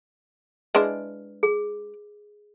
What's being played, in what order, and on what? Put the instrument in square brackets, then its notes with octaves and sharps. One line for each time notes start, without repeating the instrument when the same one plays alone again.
[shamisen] G#3 D4 E4 [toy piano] B4
[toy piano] G#4